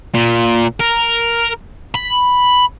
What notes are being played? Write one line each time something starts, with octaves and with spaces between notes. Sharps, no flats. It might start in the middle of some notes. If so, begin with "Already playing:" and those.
A#2
A#4
B5